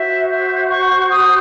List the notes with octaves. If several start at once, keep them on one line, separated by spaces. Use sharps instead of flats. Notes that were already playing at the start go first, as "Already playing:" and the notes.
Already playing: F#4 C5 E5
E5
C#6
D#6